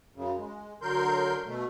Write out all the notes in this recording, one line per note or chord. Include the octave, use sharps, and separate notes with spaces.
F#2 C#3
G#3
D3 F#3 A#4 C6 G6
B2 A3